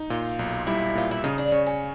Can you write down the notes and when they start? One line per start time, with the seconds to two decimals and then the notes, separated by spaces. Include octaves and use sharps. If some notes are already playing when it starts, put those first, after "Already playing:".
Already playing: D#4
0.10 A#2 F4
0.39 B1
0.67 G3 E4
0.95 A#2 F4
1.11 E4
1.24 C#3 D#4
1.38 D4
1.52 C#3 C#4
1.67 C#4